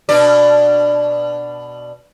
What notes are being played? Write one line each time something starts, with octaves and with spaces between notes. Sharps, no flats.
B2 D4 D5